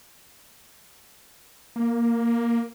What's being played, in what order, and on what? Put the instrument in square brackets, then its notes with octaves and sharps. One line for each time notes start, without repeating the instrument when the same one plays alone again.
[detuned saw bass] A#3